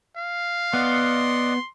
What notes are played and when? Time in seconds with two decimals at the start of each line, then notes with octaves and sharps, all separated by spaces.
0.16 F5
0.73 B3 D5 D#5 F#5 C6